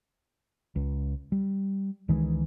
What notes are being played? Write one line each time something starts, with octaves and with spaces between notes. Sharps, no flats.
C#2
G3
C#2 D#3 E3 G#3